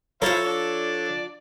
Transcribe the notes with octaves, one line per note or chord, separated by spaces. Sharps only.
F3 E4 A4 C5 C#5 F5 A#5
D4 D5